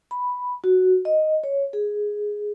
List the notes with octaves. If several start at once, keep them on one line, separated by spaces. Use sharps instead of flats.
B5
F#4
D#5
C#5
G#4